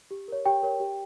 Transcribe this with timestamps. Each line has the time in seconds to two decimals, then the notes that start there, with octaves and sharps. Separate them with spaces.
0.11 G4
0.28 A#4 C#5
0.46 G4 G5
0.63 A#4 C#5
0.80 G4